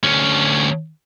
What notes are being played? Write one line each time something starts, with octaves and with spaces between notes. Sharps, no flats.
D2 C#4